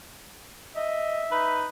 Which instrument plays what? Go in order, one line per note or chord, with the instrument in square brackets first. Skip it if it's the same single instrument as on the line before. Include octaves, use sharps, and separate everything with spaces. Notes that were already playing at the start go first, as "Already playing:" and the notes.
[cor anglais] D#5 [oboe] E5
[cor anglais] D#4 [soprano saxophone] B4